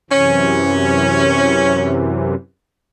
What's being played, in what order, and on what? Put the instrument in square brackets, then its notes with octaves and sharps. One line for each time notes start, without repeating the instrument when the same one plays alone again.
[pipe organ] F#2 C3 E3 [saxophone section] C#4